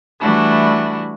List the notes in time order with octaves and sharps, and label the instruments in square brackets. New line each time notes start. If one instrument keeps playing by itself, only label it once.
[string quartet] E3 G3 A3 D4 E4 F#4